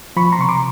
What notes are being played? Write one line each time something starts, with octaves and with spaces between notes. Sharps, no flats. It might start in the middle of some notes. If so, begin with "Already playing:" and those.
F3 B5 C#6
A#5 C6
C3 C#6
C6 D6